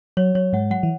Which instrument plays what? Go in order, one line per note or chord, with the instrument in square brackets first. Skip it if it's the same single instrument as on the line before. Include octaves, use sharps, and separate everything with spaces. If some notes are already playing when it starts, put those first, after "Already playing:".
[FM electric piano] F#3 [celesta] C#5
[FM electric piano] F#3 [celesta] C#5
[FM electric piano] G#2 G#3 [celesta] F#5
[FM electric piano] F#3 [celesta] F#5
[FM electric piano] E3